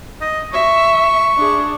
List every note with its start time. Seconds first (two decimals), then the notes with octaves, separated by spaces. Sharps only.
0.21 D#5
0.53 E5 C#6
1.37 D4 G#4